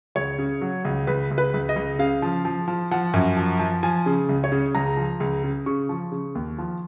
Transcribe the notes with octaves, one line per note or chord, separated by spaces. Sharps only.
C#2 C#5
C#3
F#3
C#2
C#2 B4
C#2
B4
C#2
D#5
C#2
C#3 F5
F3
F3
F3
F3 F#5
F#2
F3
F3
F3 G#5
C#3
C#2
C#5
C#3
C#2 A#5
F3
C#2
C#3
C#3 C#6
F3
C#3
D#2
F3